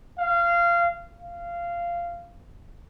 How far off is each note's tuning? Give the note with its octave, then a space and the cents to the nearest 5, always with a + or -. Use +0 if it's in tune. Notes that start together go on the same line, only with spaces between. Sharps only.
F5 -20
F5 -15